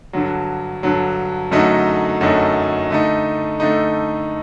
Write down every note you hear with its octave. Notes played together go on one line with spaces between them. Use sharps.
G2 D3 F#3
G2 D3 F#3
F#2 D3 F#3 A3 D#4
F#2 D3 F#3 A3 D#4
D3 A3 D#4
D3 A3 D#4